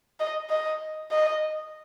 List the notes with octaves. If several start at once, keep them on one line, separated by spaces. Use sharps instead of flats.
D#5
D#5
D#5